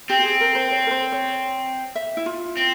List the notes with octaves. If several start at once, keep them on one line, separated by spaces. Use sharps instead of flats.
C4 G4
G4
G#4
A#4
C5
C#5
A#4
C5
C#5
E5
E4
F4
C4